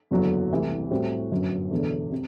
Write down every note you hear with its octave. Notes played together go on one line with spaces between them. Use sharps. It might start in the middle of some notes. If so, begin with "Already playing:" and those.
F#1 E2 D3 F#3
C2 C3 E3 A3
A2 G3 C4 F#4
G1 F#2 F#3
E1 E2 D3
C3